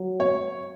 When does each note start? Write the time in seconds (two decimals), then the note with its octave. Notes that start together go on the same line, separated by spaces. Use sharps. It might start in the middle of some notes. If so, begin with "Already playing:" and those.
Already playing: F#3
0.20 C#5